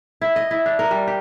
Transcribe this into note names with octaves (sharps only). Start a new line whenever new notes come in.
E4
D#5
E4
D4
A#4
G3
G4